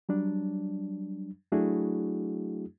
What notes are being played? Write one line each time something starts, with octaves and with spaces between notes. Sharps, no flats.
F#3 G3 D4
F#3 A3 D4 E4 F#4 G#4